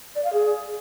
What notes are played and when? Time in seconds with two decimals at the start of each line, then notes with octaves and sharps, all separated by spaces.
0.15 D5
0.24 F5
0.33 G#4